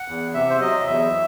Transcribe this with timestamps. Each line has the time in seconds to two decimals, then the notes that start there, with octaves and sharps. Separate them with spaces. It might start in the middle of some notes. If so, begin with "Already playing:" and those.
Already playing: F#5
0.08 E2
0.34 C3 E5
0.50 C5
0.61 F#3 D#5
0.86 E2 E5